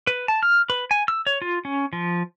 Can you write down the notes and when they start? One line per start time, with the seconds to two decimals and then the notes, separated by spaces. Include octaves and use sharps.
0.07 B4
0.28 A5
0.43 F6
0.70 B4
0.91 G#5
1.08 E6
1.27 C#5
1.42 F4
1.65 C#4
1.93 F3